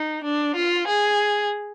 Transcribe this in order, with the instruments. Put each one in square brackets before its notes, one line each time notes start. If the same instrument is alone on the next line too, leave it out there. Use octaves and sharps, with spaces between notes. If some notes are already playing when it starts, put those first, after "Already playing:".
Already playing: [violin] D#4
D4
F4
G#4